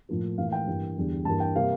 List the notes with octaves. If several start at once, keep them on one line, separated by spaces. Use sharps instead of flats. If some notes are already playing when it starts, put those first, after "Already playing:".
A2 F3 A#3
A2 E3 A#3 F5
F5
G5
G2 E3 A#3
E2 D3 G3
G2 E3 A#3 A5
G5
C3 G3 A#3 F5